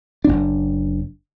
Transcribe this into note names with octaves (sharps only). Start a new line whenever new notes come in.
F#1 D4